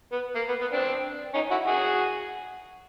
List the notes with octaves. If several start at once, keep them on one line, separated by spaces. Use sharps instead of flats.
B3
A#3
B3
B3
C4 D4
C#4 D#4
E4 F#4
F#4 G#4